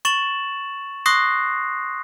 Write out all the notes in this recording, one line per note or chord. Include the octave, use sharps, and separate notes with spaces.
C#6 A6 E7 F#7
C6 C#6 D#6 F#6 A#6 C7